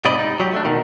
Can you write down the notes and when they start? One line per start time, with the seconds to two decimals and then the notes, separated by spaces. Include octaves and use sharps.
0.05 G#2 C3 D5 D#5 B5
0.19 D#4
0.40 F#3 G4
0.53 A3 D4
0.65 B2 D#3